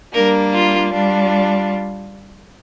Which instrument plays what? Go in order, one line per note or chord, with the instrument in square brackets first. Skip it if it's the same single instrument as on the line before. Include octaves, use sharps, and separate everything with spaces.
[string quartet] G3 A#3 D4 [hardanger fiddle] A#4
[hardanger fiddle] F4
[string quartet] G3 D4 F4